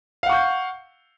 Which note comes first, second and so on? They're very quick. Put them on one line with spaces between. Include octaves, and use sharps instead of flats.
F5 F#5 C#6 G6